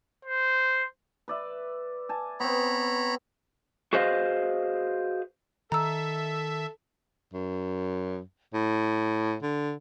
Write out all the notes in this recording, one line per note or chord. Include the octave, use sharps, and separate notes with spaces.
C5
B4 D5 E5
G#5 A5
B3 C4 C#5 A#5 B5
F#4 G#4 B4 C5 D#5 F5
D#3 A4 E5 A#5 E6
F#2
A2
D3